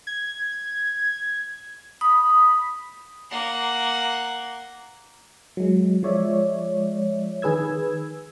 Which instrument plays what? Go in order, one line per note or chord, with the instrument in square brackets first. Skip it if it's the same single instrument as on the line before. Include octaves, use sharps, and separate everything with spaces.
[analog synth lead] G#6
[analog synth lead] B5 [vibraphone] D#6
[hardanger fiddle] A#3 F#5
[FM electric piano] F#3 G#3
F3 G#3 C#5 D5 E5
D#3 G#4 B4 E6 G#6